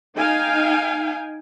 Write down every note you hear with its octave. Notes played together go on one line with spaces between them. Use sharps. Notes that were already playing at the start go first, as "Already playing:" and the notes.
D#4 F5 G5 G#5